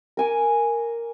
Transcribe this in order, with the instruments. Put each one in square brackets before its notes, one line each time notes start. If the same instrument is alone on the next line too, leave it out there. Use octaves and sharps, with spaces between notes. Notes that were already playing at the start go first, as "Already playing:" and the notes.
[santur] A#4 G#5 D6